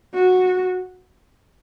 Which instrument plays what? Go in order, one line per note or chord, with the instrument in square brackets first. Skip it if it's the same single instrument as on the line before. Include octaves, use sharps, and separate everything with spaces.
[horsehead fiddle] F#4